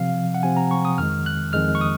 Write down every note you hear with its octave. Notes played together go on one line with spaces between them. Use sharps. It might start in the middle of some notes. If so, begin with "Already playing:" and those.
Already playing: C3 F3 C4 F5
F#5
C3 F3 C4 G#5
A#5
C#6
D#6
F2 D#3 G#3 F6
F#6
F2 D#3 G#3 F6
C#6
D#6